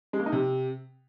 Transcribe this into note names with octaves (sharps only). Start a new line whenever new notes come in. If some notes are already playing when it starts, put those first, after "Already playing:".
G#3
A#3
D#4
C3